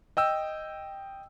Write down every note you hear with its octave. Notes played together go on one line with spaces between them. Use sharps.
D#5 G5 E6